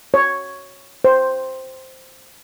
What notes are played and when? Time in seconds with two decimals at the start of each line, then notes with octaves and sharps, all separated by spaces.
0.14 C#5
1.04 C5